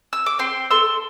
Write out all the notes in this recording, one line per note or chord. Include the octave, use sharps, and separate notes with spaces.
E6
D6
C4 G5 C6
A4 C6 E6